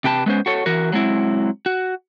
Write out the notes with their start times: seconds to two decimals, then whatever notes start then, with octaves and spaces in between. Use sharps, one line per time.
0.04 C3 G4 B4 A5
0.26 G#3 B3 C#4 C5
0.46 F#4 A4 C#5
0.66 E3 F#4 A#4
0.92 F#3 G#3 C4 E4
1.66 F#4